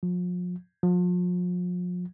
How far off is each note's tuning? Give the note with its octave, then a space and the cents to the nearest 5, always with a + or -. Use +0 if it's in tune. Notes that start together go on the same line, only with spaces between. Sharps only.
F3 +40
F3 +40